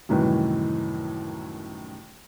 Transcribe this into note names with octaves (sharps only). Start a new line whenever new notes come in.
C2 F#2 A2 D#3 E3 B4